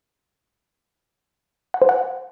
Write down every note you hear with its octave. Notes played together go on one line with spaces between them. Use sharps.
F#5
C5
F#5